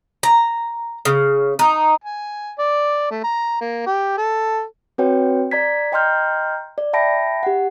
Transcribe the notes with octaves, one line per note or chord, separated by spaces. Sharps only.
A#5
C#3
D#4
G#5
D5
A3
A#5
A#3
G4
A4
C4 F#4 B4 C#5 G5
D5 A#5 G#6 B6
D#5 G5 A#5 C6 F6 G6
D5
E5 G5 A5 B5 A#6 D7
G4 F#5